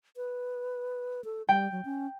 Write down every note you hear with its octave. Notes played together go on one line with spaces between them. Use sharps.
B4
A4
G3 G5
F#3
C#4